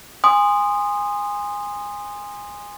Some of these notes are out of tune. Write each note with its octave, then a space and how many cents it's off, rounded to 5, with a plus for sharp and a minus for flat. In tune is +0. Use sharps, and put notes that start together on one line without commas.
G#5 -20 C6 +0 D#6 -15